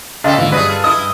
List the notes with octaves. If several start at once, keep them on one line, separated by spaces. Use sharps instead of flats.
C#3 D4 F4 A4 D#5 F5 G5
G#2 B2 D3 E3 F4
G2 F#3 A3 G#4 B4 D5 D#5 B6
F4 A4
E4 D#5 D#6
G2